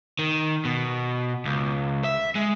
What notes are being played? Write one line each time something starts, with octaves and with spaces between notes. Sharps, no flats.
D#3
B2
C#2
E5
G#3